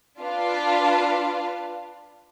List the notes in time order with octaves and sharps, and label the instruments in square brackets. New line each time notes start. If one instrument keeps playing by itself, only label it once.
[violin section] D4 F4 B4 F5